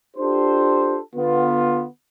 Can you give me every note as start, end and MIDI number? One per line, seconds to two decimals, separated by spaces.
0.17 0.99 62
0.17 0.99 65
0.17 0.99 67
0.17 0.99 69
0.17 0.99 72
1.15 1.86 50
1.15 1.86 59
1.15 1.86 65